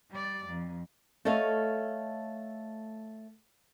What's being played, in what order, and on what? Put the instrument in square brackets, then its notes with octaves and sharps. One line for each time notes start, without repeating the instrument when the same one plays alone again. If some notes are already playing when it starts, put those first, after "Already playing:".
[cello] G3 D5
F2
[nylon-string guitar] A3 A4 C#5 D#5 F5